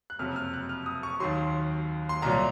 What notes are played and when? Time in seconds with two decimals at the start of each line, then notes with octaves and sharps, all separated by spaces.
0.10 F#6
0.19 F#1 F2 C3 F#3 F6
0.36 F6
0.53 F#6
0.69 F6
0.86 D#6
1.03 C#6
1.20 D#2 D#3 F#3 C6
2.09 C6
2.22 C2 A#2 F#3 A#5